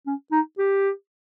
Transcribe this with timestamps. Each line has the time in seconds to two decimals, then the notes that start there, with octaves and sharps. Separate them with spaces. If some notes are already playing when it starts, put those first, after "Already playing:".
0.07 C#4
0.32 D#4
0.58 G4